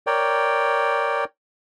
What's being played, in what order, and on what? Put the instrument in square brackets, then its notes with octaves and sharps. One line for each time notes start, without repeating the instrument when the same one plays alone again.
[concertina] A#4 C#5 D5 G5